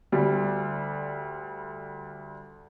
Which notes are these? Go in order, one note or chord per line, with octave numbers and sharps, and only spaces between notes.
D2 G3